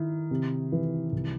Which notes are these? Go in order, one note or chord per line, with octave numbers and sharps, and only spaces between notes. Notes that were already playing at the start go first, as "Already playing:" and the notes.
Already playing: D#3 E4
C3
E3
C2